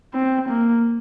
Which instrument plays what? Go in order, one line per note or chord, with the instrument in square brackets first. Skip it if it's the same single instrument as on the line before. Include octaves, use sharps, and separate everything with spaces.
[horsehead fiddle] C4
A#3